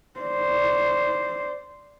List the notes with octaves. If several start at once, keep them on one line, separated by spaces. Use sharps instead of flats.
C5 D5